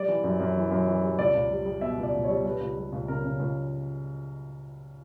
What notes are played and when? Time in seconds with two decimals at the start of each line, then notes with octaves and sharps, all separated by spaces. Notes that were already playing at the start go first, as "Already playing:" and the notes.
Already playing: G3 D5
0.08 E3
0.24 F#2
0.40 F#2
0.56 E3
0.71 F#2
0.87 E3
1.03 G3
1.18 C#2 D5
1.34 C#2
1.51 G3
1.66 G3
1.81 B2 E5
1.98 C#2
2.03 D5
2.14 C#2
2.24 G3 C#5
2.45 G3 B4
2.60 C#2
2.76 G3
2.92 C#2
3.08 C#3 A#4
3.24 C#3
3.39 C#2